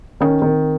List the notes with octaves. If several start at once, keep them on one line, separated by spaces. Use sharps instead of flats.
D#3 C#4
D#3 C4